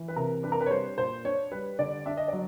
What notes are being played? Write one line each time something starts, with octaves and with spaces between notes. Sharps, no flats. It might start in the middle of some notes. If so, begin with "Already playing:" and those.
Already playing: E3
B4
C3 A#4
D4 B4
A#4
B4
C#5
G3 C5
A#2 C5
D4 C#5
G3 B4
D3 D5
D4 E5
D#5
F#3 D5